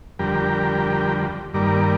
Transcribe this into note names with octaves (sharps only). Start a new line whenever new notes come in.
F2 D3 G3 G4 A#4
G2 D#3 G3 A#3 A#4 D5